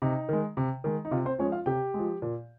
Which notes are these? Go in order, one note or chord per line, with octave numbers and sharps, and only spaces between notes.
C3 D#4
D#3 G#3
C3
D#3 G#3
D#4
C3 F4
C4 C5
F3 G#3 C#4 C#5
F4 F5
C3 G4 G5
F3 G#3
A#2